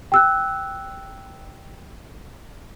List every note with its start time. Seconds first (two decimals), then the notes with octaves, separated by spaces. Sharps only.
0.12 G5 E6 F#6